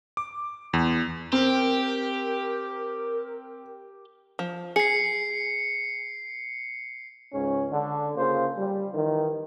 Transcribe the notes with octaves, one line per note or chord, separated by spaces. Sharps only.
D6
E2
C4 G4 A#4
F3
G#4 C7 C#7
C#2 G#2 C#4
D3
C#3 A#3 F4 C5
G3
D#3 E3